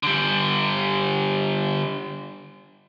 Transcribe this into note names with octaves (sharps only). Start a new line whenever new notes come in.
D3 G3